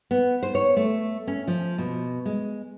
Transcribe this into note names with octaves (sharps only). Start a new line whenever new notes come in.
B3
C5
C#5
A3
C#4
F3
B2
G#3